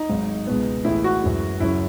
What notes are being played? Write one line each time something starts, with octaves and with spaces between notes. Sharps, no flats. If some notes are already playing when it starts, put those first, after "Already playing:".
Already playing: D#4
G#1 G#2 F#3
C#2 B2 G#3 B3
A1 A2 E3 G#3 E4
F#4
F#2 E3 G#3
F#2 C#3 F#3 C#4 E4